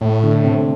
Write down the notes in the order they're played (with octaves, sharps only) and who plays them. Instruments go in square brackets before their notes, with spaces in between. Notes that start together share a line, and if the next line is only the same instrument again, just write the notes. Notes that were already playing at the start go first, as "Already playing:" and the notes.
[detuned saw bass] A2 [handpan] A3
[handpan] D3 D4
C3 C4